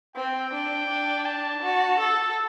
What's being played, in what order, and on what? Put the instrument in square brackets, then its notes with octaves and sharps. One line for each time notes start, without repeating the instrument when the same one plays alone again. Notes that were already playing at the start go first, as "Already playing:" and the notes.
[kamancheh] C4 [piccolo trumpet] G5
[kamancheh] D4
D4
[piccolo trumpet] A5
[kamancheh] F#4
A4